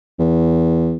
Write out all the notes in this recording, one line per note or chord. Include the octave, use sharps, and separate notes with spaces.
E2